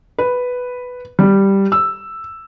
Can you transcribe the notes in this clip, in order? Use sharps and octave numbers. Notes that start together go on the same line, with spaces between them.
B4
G3
E6